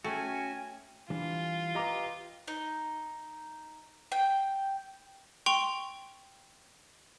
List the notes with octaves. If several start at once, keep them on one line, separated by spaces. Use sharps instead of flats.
A3 C#4 F#4 G5 G#5
E3 G3 D4 F4
G4 B4 D#5 A#5 D6
D#4
G5
G5 C6 C#6 F7